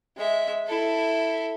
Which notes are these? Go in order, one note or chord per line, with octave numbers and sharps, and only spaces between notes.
G#3 E5
E4 A4